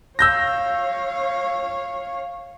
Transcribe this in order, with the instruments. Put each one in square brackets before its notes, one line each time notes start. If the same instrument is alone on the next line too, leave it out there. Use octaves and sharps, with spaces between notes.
[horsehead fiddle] C#5 F5 [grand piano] E6 G6 A#6